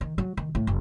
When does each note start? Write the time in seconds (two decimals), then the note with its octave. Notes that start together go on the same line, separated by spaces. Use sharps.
0.01 D#3
0.18 F#3
0.37 D#3
0.55 A2
0.67 F#1